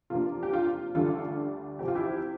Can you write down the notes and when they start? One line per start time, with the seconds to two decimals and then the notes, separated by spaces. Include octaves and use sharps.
0.10 C3 F3 A#3 D4 F4
0.43 G4
0.53 F4
0.95 D2 D3 G3 D4 F4 A4
1.79 C3 F3 C4 G4
1.88 F4
1.95 E4 G4